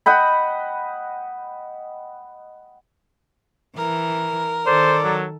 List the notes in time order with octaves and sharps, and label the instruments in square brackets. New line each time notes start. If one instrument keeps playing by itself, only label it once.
[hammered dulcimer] D#5 F#5 G5 B5
[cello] E3 [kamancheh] A#4
[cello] D#3 A4 [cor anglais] C5 [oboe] D5
[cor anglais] F#3